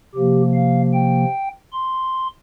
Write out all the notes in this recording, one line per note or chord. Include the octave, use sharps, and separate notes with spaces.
C3 F3 A#3 G4
F5
G5
C6